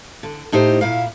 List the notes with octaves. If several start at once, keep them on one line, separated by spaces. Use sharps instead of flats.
D3
A2 D#4 G4 C5
A#2 E4 F5